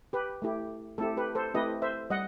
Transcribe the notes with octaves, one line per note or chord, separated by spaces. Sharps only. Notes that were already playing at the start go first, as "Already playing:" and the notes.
G4 B4
A3 E4 G4
A3 C4 E4 G4 A4
G4 B4
A4 C5
A3 C4 E4 G4 B4 D#5
C5 E5
G3 D#5 F#5